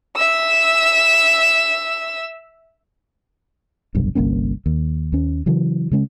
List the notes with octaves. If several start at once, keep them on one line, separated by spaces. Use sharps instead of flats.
E5 E6
F1 B1 G2
G1 C2 A#3 C#4
D#2
D#2 C#4
C#3 E3 F#3
C#3 G#3 C#4